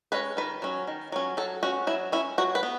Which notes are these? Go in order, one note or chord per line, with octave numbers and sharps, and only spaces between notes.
G#3 C#4 B4
D#3 B4
F#3 C#4
D#3
F#3 C#4
F#3 A4
C#4 F#4
F#3 E4
C#4 E4
F#3 F#4
B4
B3